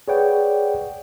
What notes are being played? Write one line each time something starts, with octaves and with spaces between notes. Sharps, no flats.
G#4 B4 C#5 D5 F#5 G5